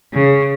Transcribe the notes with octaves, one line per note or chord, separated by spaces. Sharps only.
C#3